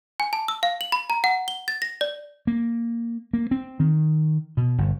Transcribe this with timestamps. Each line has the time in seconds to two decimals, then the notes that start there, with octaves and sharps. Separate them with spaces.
0.20 G#5
0.33 A5
0.48 E6
0.63 F5
0.81 F#7
0.92 B5
1.10 A#5
1.24 F#5
1.48 G7
1.68 A6
1.82 A#6
2.01 D5
2.47 A#3
3.33 A#3
3.51 C4
3.80 D#3
4.57 B2
4.78 G1